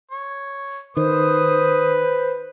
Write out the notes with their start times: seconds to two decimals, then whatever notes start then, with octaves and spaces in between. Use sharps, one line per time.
0.11 C#5
0.97 D#3 B4 C5 D#6